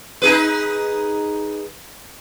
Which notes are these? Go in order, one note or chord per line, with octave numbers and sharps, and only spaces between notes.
D#4 G#4 B4